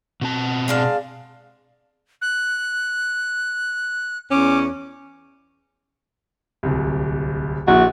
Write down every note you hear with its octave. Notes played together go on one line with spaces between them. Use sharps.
B2 C4 A5
G#3 D4 F5
F#6
E2 C#4 D6
D1 C2
A#1 A#2 E4 F#4